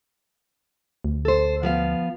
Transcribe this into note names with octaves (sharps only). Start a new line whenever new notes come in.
D2
A4 C5
F3 B3 F5